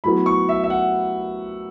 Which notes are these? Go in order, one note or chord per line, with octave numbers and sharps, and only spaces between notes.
A2 F#3 B3 B5
C#6
E5
E5
F#5